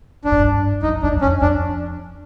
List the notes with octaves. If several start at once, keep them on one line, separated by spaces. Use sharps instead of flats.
G2 D4
G#2
G2
F#2 D#4
E2 D4
F#2
F2 C#4
F2 D4